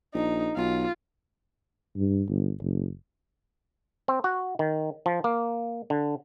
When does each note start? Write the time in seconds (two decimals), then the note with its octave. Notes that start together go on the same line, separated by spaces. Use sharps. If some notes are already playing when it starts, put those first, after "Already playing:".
0.14 A#1 D#4
0.56 B1 F4
1.96 G2
2.28 G1
2.62 F#1
4.08 C4
4.24 F#4
4.59 D#3
5.06 F3
5.24 A#3
5.90 D3